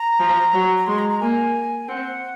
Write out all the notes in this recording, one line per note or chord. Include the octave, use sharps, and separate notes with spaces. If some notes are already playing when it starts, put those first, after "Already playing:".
Already playing: A#5
F3
F#3
A#5
G#3 C6
A#5
A#5
A#3 G#5
C4 F#5